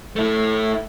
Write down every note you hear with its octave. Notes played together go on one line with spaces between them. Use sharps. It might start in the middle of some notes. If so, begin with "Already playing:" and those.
A3 E4